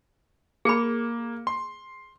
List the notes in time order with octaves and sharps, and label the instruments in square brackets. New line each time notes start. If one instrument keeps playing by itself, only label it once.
[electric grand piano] A#3 C#7 [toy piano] G#4 B5
[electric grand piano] C6